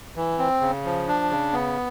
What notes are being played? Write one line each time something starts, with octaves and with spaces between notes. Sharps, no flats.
E3
C4
C#3
F3
D4
C#3
B3